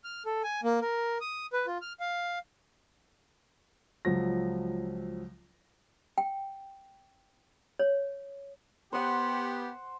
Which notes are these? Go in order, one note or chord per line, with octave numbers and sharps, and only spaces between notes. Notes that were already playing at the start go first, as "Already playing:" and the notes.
F6
A4
G#5
A#3
A#4
D#6
B4
F4
F6
F5
C#2 F3 F#3 A#6
G5
C#5
B3 G4 C5 F#5